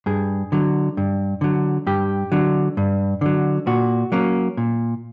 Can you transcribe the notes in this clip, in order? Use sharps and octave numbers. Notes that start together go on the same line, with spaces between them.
G2 G#4
D3 F#3
G2
D3 F#3
G2 G4
D3 F#3
G2
D3 F#3
A#2 F#4
F#3 A#3 C#4
A#2